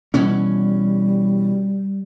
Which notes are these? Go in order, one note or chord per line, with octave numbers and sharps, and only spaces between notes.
B2 E3 G3 C#4